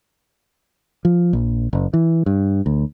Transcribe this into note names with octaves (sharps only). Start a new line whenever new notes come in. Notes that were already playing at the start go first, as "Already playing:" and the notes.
F3
A#1
F#1
E3
G2
D2